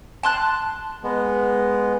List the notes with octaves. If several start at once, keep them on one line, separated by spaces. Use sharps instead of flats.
A5 C6 F#6
G#3 B3